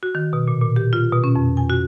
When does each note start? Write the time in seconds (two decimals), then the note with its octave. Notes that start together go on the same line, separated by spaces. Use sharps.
0.03 F#4
0.15 D#3
0.33 B2
0.48 A#2
0.62 A#2
0.76 G4
0.93 F4
1.12 B2
1.24 C#4
1.36 F2
1.57 G#5
1.70 F#4